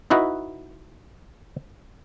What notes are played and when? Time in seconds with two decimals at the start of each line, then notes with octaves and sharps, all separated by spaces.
0.10 D#4 E4 F#4 B4 D#5